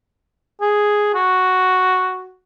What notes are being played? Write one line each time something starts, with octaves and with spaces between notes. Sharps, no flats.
G#4
F#4